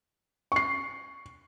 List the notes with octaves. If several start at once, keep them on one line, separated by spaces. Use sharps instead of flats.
C#6 C7